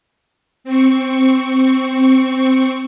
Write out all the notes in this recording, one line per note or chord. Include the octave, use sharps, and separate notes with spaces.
C4 C#6